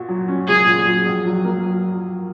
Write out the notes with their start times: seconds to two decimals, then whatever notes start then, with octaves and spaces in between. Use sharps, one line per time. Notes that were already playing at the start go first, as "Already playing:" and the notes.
Already playing: A#2 F#4
0.09 F#3
0.28 C#4
0.47 A#2 G#4
0.66 A#2
0.86 F#3
1.06 A#1
1.25 F#3
1.45 A#3
1.64 F#3